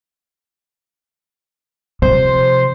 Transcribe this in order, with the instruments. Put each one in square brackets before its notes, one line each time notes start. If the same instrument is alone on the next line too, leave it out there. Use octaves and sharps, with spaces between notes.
[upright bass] C3 F3 [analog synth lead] C5